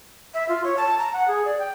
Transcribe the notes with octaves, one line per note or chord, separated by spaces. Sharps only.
E5
F4
C#5
A5
A#5
F#5
G#4
D5
G5